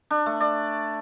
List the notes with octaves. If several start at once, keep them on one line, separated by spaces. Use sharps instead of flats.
D4
A3
D5